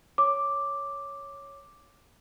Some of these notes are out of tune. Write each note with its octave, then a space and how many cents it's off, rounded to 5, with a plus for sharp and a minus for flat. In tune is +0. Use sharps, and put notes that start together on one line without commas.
C#5 +0 D6 +0